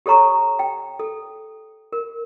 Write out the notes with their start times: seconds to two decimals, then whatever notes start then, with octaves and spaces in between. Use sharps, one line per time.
0.06 G4 A4 C#5 A#5 C#6
0.59 G5
0.99 A4
1.93 A#4